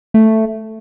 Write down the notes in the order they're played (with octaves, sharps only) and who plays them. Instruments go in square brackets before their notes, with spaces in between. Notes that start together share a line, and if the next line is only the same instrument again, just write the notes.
[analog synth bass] A3